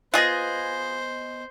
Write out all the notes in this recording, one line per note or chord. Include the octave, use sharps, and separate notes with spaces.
B3 F4 G#4 C5 D#5 G#5 F#6 A#6